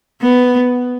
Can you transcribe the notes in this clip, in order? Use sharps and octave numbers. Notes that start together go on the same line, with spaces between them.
B3